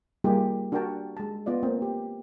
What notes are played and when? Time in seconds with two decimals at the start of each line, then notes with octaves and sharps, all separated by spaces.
0.24 G3 A#3 D#4 F4 G4 G#4
0.72 D4 F#4 G4 A#4 G5 A5
1.17 G#3 A5
1.46 B3 F4 D5 D#5
1.63 A#3 C4 G5
1.82 G4